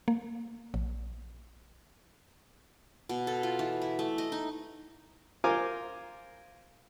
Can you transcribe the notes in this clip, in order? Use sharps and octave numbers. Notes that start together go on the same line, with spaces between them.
A#3
A#1
B2
A4
F4
E3
E4
A3
D#5
D#4
F4 A#4 C5 G#5 D6